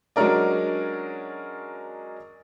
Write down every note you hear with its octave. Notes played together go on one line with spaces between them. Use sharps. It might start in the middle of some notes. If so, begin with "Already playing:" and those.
F#3 G#3 C#4 D4 A#4 D5